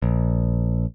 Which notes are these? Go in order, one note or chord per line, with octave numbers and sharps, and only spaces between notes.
A#1